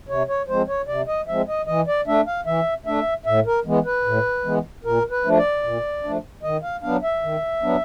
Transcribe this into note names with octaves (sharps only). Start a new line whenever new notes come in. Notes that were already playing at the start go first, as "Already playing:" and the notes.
C3 C#5
C#5
F3 G#3 C4 C5
C#5
C3 D5
D#5
F3 G#3 C4 E5
D#5
E3 D#5
D5
A3 D4 E5
F5
E3 E5
A3 D4 E5
A2 E5
A#4
E3 G#3 B3
B4
A2
E3 G#3 B3
A#2 A#4
B4
F3 A3 D4
D5
A#2
F3 A3 D4
D#3 D#5
F5
F#3 B3 D4 F5
E5
D#3
F#3 B3 D4